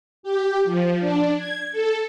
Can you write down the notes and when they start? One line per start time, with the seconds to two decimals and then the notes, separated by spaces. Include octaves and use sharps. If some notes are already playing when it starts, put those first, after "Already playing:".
0.23 G4
0.65 F3
0.99 D4
1.37 G#6
1.72 A4